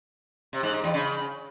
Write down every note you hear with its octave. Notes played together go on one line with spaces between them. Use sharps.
C3
G#2
G#2
E2
C#3